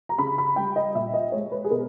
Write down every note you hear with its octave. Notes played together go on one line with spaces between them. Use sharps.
A#5
C#3 B5
B5
G3 G5
D#5
A#2 E5
D#5
G#3 C#5
B4
G#4
B2 A#4